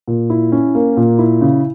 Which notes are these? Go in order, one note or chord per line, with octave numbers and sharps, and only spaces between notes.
A#2
E4
C#4
A#3
A#2
E4
C#3